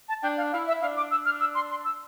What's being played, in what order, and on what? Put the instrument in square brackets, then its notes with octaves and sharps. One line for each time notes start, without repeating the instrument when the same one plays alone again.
[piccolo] A5
[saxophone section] D4 [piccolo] G5
[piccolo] F5
[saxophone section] E4 [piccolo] F5
[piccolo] E5
[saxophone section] D4 [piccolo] F5
[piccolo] D6
E6
F6
E6
C6
C6
E6